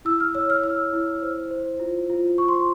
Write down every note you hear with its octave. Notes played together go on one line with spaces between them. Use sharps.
E4 E6
F6
C#5 E6
F6
E4 E6
E4
C5
C5
F4
F4
C5 C#6
C6